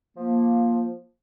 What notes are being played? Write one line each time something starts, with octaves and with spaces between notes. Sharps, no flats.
F3 A#3